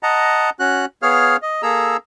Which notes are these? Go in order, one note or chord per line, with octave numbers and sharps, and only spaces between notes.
D#5 F#5 A5 A#5
C#4 F#4 F#6
B3 G#4 C#5 F5 F6
D#5
A#3 G#4 A4 A#5 E6